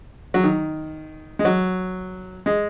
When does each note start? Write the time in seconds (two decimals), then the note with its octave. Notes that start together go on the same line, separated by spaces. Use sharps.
0.34 F#3
0.43 D#3
1.39 G#3
1.45 F#3
2.46 G#3